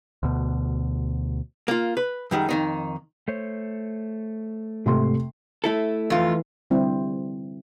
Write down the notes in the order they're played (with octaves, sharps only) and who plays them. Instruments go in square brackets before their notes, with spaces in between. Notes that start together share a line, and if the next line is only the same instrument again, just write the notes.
[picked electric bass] D2 B2
[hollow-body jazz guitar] A#3 F4
B4
F#2 D#3 G3 G#3
F2 D#3 D#4
[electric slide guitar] A3 C5 C#5
[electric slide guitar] G#2 [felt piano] C3 A3 C6
[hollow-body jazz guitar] A3 E4 A4
[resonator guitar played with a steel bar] F2 F4 [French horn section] E3
[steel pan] D3 G3 C4 E4